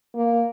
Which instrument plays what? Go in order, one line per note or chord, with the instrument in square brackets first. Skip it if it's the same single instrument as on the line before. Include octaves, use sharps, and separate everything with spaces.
[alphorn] A#3